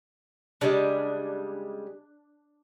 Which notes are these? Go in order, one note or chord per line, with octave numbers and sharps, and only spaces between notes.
C#3 G3 G#3 D4